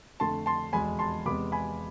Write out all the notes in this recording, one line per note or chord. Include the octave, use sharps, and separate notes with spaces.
F2 D3 A3 A5 C6
A5 C6
F1 E2 B2 G#3 G#5 B5
A5 C6
E2 C3 G#3 B3 B5 D6
G#5 B5